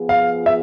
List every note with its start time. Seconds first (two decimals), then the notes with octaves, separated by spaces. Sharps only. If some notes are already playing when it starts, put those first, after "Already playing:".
Already playing: F3 B3 F4 G#4
0.09 F5
0.46 E5